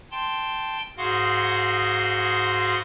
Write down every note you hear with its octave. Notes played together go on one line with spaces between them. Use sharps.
G5 A5 C6
G#2 F#4 G#4 F5 F#5 C6